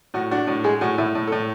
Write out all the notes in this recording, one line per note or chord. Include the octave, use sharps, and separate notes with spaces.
A2 F#4
D4 F#4
A2 F#4
G#3 G#4
A2 F#4
A2 E4
A2
A4
A2